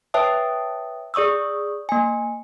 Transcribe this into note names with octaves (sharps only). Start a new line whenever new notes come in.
B4 C#5 E5 G5 A5 D#6
G#4 D5 C#6 D#6 E6
A#3 G#5